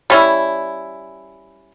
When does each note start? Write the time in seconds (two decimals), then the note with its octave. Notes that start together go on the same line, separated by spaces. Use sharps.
0.10 G3 C#4 E4